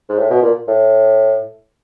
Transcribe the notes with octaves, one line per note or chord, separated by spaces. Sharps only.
G#2
A2
B2
A#2
A2